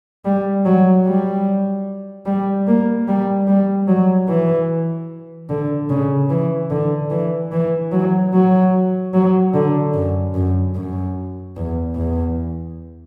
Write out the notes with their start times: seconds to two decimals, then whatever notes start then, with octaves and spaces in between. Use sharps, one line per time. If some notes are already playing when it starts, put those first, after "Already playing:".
0.25 G3
0.65 F#3
1.06 G3
2.26 G3
2.67 A#3
3.08 G3
3.48 G3
3.88 F#3
4.29 E3
5.50 D3
5.90 C#3
6.30 E3
6.71 D3
7.11 E3
7.52 E3
7.92 F#3
8.33 F#3
9.14 F#3
9.54 D3
9.94 F#2
10.34 F#2
10.76 F#2
11.56 E2
11.96 E2